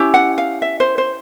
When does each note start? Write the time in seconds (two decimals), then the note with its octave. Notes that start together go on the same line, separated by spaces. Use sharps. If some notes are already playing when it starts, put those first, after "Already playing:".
Already playing: C#4 E4 G4
0.14 F#5
0.38 F5
0.62 E5
0.80 C5
0.98 C5